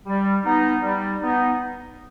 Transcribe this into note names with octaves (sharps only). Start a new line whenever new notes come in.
G3
B3 D#4
G3
B3 D#4